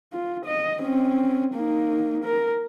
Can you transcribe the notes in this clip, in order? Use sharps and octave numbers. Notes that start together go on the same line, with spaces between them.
F4
D#5
C4 C#4
A#3 D#4
A#4